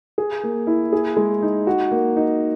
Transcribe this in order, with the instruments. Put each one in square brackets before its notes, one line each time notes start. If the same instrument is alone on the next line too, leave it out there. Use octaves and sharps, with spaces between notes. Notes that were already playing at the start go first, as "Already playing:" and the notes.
[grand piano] G#4
A#3
E4
G#4
G#3
D#4
F#4
A#3
D#4